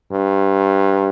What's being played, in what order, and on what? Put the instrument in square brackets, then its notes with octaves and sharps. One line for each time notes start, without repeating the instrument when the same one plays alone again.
[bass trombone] G2